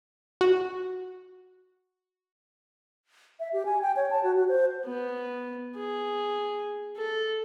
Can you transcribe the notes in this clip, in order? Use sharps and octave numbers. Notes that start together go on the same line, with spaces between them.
F#4
E5
G4
G#5
G5
C#5
A5
F#4
F#4
C5
B3
G#4
A4